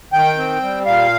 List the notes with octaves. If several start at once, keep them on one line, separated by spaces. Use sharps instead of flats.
D#3 G5
C4
G3
A#2 F5